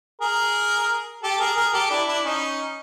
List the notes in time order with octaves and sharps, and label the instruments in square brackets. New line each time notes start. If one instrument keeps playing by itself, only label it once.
[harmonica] G#4 A#4
G4 A4
G#4 A#4
G#4 A#4
G4 A4
D4 E4
D4 E4
C#4 D#4